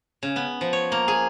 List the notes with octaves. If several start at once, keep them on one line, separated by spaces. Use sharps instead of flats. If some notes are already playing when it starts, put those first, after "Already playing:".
C#3
B3
F3
C#5
A#3
G#4